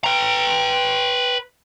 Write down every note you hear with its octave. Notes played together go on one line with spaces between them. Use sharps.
B4 G5 A#5